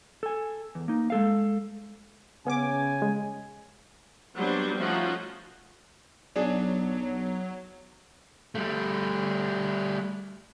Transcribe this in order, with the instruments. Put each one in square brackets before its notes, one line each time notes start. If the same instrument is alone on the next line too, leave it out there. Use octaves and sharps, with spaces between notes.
[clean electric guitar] A4 G#5
E2
A#3 D#4
G#3 A4 F5
[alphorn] C#3 [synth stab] B3 C#4 D6 [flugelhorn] G#5
[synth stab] G#3
[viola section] F#3 G3 A#3 B3 D4 C5
F3 A3 C#4 D#4 F#4
[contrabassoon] B1 [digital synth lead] F#3 [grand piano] D4 G#4
[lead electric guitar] G3 A3